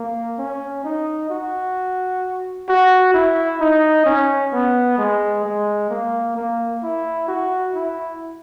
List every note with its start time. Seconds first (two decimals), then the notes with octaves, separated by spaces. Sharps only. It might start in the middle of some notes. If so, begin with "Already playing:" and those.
Already playing: A#3
0.39 C#4
0.84 D#4
1.30 F#4
2.69 F#4
3.14 E4
3.60 D#4
4.06 C#4
4.53 B3
4.98 G#3
5.44 G#3
5.90 A#3
6.37 A#3
6.83 E4
7.28 F#4
7.75 E4